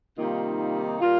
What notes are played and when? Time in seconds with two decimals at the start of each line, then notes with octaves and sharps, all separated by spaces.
0.16 C3 D#3 G3 A#3 D#4 F4
1.00 A#2 G3 A#3 F4